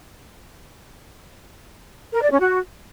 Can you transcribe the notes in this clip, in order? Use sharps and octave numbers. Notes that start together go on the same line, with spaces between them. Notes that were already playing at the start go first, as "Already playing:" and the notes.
A#4
D5
C#4
F#4